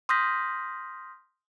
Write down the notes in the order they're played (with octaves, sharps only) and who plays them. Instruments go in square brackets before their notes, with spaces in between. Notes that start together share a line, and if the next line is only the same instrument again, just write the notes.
[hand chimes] C6 D#6 F6 G6 A#6 B6